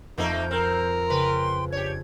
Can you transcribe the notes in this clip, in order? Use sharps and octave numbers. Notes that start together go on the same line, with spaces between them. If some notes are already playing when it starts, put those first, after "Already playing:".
F2 A3 A#3 D#4 A#5 G6
C4 A#4 F6
C#3 B4 G5 C6
D4 G4 C#5 G#6